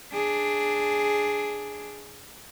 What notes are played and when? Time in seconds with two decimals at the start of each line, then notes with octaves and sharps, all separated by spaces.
0.13 D4 G#4